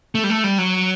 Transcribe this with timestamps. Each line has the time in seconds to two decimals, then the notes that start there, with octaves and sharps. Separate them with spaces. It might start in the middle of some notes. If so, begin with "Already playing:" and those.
0.15 A3
0.24 G3
0.30 A3
0.44 G3
0.58 F#3